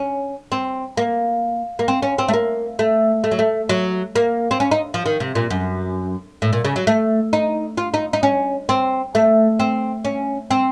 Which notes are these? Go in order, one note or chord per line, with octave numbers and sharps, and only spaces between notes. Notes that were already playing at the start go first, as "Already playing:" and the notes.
Already playing: C#4
C4
A#3
A#3
C4
C#4
C4
A3
A#3
A3
A3
F#3
A3
F#3
A#3
C4
C#4
D#4
F3
D#3
C3
A#2
F#2
A2
A#2
C#3
F#3
A3
D#4
F4
D#4
D#4
C#4
C4
A3
C4
C#4
C4